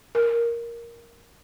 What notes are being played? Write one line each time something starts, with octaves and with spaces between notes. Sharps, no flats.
A#4